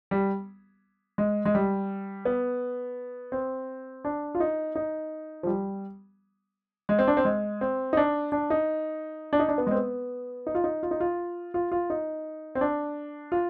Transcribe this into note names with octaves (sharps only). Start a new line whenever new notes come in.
G3
G#3
G#3
G3
B3
C4
D4
F4
D#4
D#4
F3
G3
G#3
C4
D4
C4
G#3
C4
D#4
D4
D4
D#4
D4
D#4
D4
B3
G#3 C4
B3
D#4
F4
D#4
F4
D#4
F4
F4
F4
D#4
C4
D4
F4